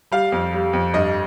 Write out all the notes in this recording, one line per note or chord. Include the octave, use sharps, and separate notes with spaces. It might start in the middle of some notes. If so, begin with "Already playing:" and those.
G3 F5
F2
G3
F2
G2 D#5